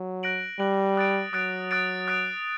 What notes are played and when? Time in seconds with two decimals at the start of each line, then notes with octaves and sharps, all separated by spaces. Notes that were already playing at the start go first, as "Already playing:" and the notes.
Already playing: F#3
0.23 F#6 A#6 D7 F#7
0.59 G3 F#6 A#6 D7 F#7
0.97 D#6 F#6 A6 D7
1.33 F#3 D#6 F#6 A6 D7
1.71 D#6 F#6 A6 D7
2.08 D#6 F#6 A6 D7